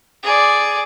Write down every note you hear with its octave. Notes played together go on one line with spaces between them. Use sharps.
G#4 D5